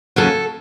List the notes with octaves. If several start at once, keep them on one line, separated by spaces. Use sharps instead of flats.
D#2 C#3 F#3 A#3 C#4 A4